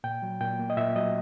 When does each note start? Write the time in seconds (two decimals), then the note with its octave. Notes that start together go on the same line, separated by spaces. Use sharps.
0.04 A#2 G5
0.22 F#3
0.41 A#2 G5
0.59 A#3
0.70 D#5
0.77 A#2 E5
0.96 F#3 D#5